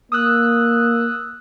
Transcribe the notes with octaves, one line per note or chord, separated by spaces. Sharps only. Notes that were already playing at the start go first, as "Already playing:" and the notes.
A#3 D#6 E6 F#6